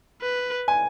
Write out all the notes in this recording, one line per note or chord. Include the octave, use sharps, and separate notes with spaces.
B4
G#5